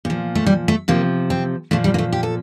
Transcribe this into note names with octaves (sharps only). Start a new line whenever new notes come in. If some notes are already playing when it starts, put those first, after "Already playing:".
A#2 F3
A3
G3
A3
C3 F3 A#3
C4
A#2 F3 A3
G3
A#3
A3
G4
A4